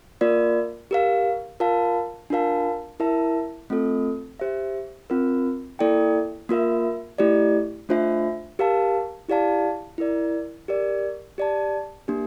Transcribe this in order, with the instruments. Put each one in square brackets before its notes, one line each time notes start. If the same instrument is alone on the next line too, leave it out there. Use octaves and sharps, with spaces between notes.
[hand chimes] A#3 F4 A#4 D5
G4 A#4 F5
F4 A#4 F5 A5
D4 F4 A#4 F5 A5
E4 A#4 E5 A5
A3 C4 F4 A4
G4 C5 E5
C4 F4 A#4
A#3 E4 A4 D5 G5
A#3 F4 A#4 E5
A3 E4 G4 D5
A3 D4 F4 C5 E5
G4 A#4 F5 A5
E4 G4 D5 F5 A5
E4 A#4 D5
G4 A#4 D5
G4 D5 A5
A#3 D4 G4